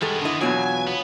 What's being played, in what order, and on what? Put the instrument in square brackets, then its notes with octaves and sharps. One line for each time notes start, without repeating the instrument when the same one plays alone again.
[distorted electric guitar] D#3 B3 [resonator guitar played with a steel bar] G3 G#3 A4
[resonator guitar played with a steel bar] D3 D#5 [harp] D4 E4
[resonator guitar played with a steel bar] E2 B2 F#3 [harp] B3 F4 C#5 [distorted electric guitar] G#5
[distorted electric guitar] B3